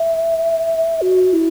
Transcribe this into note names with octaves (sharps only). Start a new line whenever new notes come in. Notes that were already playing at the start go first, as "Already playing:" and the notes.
Already playing: E5
F#4
E4